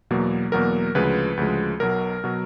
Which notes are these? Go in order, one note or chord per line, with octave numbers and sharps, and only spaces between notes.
E2 B2 F#3 A#3
E2 B2 F#3 A#3 A#4
D2 C#3 F3 G#3 B4
D2 C#3 F3 G#3
B1 B2 F#3 A#4
B2 F#3